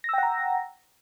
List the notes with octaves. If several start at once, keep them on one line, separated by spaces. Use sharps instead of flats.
F#5 G5 A#5 E6 A#6